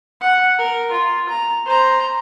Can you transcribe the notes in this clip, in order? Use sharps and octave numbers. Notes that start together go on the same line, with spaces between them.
F#5
A#4
F4
A#5
C5 A#5